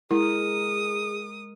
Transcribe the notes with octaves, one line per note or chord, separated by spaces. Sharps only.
G#3 E4 G#4 A#4 D#6